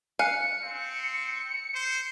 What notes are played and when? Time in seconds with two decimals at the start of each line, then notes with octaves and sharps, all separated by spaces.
0.19 F5 G#5 F#6 C#7
0.64 C4
1.75 C5